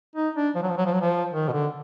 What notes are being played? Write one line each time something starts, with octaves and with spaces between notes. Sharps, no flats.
D#4
D4
F3
F#3
F3
F#3
F3
F#3
F3
D#3
B2
D3